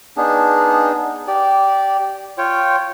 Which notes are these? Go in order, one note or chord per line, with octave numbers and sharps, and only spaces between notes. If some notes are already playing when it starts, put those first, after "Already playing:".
B3 D4 D#4 G#4
G4 D5
F4 C#5 G5